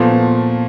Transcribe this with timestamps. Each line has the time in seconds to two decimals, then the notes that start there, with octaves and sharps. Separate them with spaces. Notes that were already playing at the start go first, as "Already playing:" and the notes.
Already playing: A#2 F3 A3 B3
0.11 B3